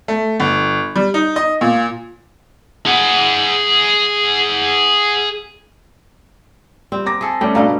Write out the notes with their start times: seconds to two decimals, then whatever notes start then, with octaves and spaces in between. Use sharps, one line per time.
0.08 A3
0.40 G1
0.96 G3
1.14 D#4
1.36 D#5
1.61 A#2
2.86 G#4 F#5
6.92 G3 C4
7.06 A#5 D6 A#6
7.21 G#4 A4
7.41 G3 A3 C#4 G5
7.55 G2 B2 D5 F5 A#5